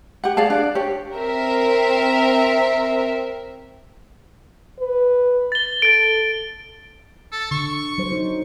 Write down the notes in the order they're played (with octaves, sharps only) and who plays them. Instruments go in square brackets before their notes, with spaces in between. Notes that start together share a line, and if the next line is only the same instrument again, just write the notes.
[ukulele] G4 F#5
G#4 D5 F5 A5
D4 D5
G4 C#5
[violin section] C4 A#4 E5
[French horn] B4
[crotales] A6 G7
[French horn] A4 [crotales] A6 D7
[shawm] A4
[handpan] D3 [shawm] C#6
[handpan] F#3 C5
D#4